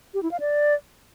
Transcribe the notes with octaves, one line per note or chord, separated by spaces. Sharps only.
G4
E4
F5
D5